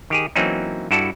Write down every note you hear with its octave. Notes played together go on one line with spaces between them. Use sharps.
D#3 G4 G#4
E3 F#3 A#3 C4 C#4 D#4
G2 E4 F#4 A4 D5 A5